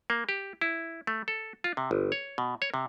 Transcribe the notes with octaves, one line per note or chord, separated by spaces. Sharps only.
A#3
G4
E4
A3
A4
F4
C3
G1
C#5
B2
C#5
C3